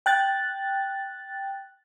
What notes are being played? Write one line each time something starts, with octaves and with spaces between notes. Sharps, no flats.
G5 F#6 A6